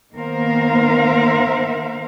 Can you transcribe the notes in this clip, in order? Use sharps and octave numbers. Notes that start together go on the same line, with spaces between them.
D#3 A#3 B3 A#4 C5 F5